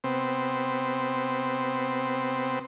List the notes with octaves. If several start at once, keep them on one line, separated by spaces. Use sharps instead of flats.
C3 B3 C4